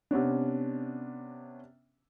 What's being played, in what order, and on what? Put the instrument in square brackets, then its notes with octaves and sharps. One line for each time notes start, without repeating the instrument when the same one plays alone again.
[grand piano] C3 B3 C#4 D4